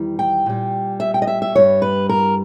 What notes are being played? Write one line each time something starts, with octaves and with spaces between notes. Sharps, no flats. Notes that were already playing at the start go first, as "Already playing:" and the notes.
Already playing: E2 D#3 G3
G5
A#2 G3
E5
G5
D#5
E5
E5
G2 G3 C#5
B4
A#4